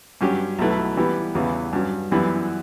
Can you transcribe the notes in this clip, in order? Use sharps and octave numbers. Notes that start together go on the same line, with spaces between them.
G2 F#3 C#4 G4
B1 B2 A3 E4 B4
E3 G3 B3 E4 G4
E2 C#3 E3 G3 B3
G2 F#3 C#4
F#2 E3 G3 B3 E4